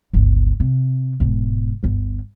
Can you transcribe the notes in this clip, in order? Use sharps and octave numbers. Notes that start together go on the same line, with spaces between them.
G1 C#2
C3
E1 G#2
G1 D2